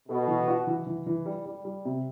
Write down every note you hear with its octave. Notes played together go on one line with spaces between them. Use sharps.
B2 A4
E3
F#4
E3
E3
E3
G3
G3
G3
C3